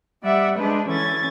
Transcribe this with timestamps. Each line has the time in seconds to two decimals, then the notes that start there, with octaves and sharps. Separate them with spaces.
0.23 G3 D5 E5 F#5
0.57 G#3 D4 B4 C5
0.87 D3 E3 C#4 G#6 A6